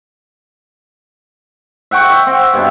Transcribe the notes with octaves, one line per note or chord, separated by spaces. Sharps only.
E5 F#5 G5 C#6
E5
C4
G2 B2